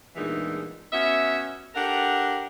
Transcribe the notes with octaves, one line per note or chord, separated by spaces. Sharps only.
E2 G2 A#2 E3 G#3 D#4
B3 C#4 F#4 E5
D4 G4 A4 A#4 F#5